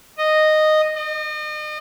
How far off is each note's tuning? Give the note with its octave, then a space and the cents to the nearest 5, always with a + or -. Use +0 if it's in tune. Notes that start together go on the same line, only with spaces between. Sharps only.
D#5 -10
D#5 -40